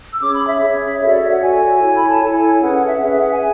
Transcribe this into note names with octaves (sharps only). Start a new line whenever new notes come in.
E6
C#4 G#4 C#5 D6
B5
E5
C#4 G#4 C#5
F#4 A4 C#5 E5
D5
E5
F#5
F#4 A4 C#5 G#5
E4 A4 C#5
B5
A5
E4 A4 C#5 G#5
C#4 G#4 B4 F#5
F#5
E5
C#4 G#4 B4
E5
F#5
G#5